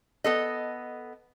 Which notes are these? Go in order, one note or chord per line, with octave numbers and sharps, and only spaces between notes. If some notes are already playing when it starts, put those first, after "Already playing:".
B3 A4 D#5